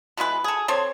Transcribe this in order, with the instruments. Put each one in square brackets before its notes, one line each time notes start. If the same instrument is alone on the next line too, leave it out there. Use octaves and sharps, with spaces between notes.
[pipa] B2 E3 G#3 B4
G#4 A4
C4 A4 C5 C#5